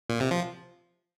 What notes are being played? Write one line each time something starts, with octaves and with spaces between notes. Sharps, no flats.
A#2
C3
F3